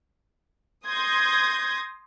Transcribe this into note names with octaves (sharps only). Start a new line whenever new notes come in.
C6 D#6 G6 G#6 A#6